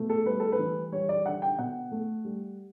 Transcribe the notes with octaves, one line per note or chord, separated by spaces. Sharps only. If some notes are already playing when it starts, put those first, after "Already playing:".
Already playing: B2 A3
A4
G3 B4
A4
B4
E3
G3 C#5
D5
D3 F#5
G5
B2 F#5
A3
G3